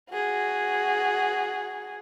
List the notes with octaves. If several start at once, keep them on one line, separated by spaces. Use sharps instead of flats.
F#4 G#4